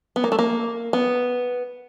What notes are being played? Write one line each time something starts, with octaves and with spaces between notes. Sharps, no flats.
B3
A#3
A3
A#3
B3